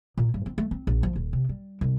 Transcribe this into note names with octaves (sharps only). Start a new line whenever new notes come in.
A#2
G2
C4
A3
C4
A#1
F3
D#1
C3
G3
C2